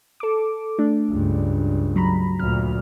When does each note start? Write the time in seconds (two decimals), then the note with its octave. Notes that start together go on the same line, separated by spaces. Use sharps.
0.20 A4 D6
0.79 A3 D4
1.10 C#2 G2
1.96 F#3 A#5 B5
2.39 D2 A#2 F6